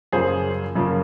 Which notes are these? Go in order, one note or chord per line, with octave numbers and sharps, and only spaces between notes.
F#1 F#2 C#3 F3 A#3 G#4 C5
F#1 F#2 C#3 F3 A#3